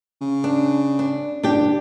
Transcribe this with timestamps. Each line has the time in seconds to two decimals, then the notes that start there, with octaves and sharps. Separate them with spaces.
0.21 C#3
0.44 D4
0.99 D4
1.43 F#1 D4 G4